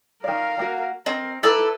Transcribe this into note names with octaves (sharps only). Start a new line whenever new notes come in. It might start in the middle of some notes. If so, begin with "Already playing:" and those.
D#3 A#4 D5 F5
A#3 F#4
C4 A#4 D#5
D#4 E4 A4 B4 D5 B5 E6